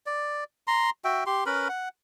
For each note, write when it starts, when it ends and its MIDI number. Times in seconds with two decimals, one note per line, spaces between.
0.06 0.44 74
0.67 0.90 82
0.67 0.90 84
1.04 1.24 66
1.04 1.24 76
1.04 1.24 79
1.26 1.44 67
1.26 1.44 84
1.46 1.68 61
1.46 1.68 70
1.46 1.68 71
1.46 1.68 83
1.69 1.89 78